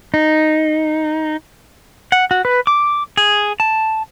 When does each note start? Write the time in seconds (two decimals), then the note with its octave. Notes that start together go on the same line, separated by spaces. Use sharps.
0.14 D#4
2.12 F#5
2.31 F#4
2.45 B4
2.67 D6
3.17 G#4
3.60 A5